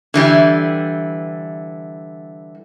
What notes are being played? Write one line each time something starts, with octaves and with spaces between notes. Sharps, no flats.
D3 E3 G3